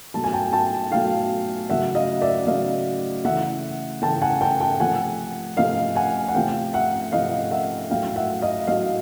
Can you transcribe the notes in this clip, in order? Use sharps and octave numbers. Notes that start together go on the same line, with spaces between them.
B2 F#3 A3 A5
G#5
G5 A5
G5 A5
B2 F#3 A3 F5 G5
C#3 F#3 A3 E5 F#5
D#5 F5
D5 E5
C#3 F#3 A3 D#5 F5
C#3 E3 A3 E5 F#5
C#3 E3 A3 G5 A5
F#5 G#5
G5 A5
G5 A5
C3 F3 A3 F#5 G#5
C3 F3 A3 D#5 F5
F#5 G#5
F#5
C3 F3 A3 F5 G5
E5 F#5
C3 F3 A3 D#5 F5
E5 F#5
A2 F#3 A3 F5 G5
E5 F#5
D#5 F5
A2 F#3 A3 D#5 F5